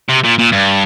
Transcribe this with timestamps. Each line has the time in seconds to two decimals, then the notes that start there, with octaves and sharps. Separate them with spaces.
0.09 C3
0.24 A#2
0.39 A#2
0.52 G2